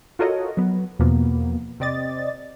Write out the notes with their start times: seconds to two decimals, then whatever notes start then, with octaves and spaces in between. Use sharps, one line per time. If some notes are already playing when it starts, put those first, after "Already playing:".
0.19 F4 F#4 A4 A#4 C#5 D#5
0.57 F#3 B3
0.99 E2 B2 F3 A#3 B3
1.80 C3 C4 D5 D#5 A6